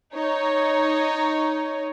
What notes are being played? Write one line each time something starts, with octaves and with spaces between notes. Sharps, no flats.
D#4 C#5